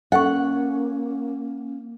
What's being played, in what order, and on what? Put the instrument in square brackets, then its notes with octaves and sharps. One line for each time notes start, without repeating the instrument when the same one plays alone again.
[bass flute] A#3 [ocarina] C#4 [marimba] A4 C#6 [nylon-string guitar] F#5